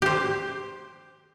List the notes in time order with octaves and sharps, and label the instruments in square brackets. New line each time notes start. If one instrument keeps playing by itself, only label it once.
[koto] G4 C5